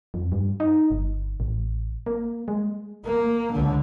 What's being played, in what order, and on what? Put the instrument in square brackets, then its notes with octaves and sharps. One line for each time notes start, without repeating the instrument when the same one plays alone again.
[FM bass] F2
G2
D#4
G1
A1
A#3
G#3
[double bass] A#3
C#2 D3